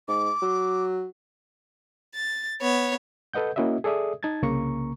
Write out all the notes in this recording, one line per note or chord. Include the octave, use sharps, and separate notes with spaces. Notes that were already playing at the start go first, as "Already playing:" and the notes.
G#2 D6
F#3
A6
B3 C#5
A4 B4 D#5 F#5 G6
A#3 C#4 E4 F#4 D#5 E5
G#4 A4 D5 E5 D#6
D#4 A5 G#6 A6
C2 C#3 A#3 A#5 C#6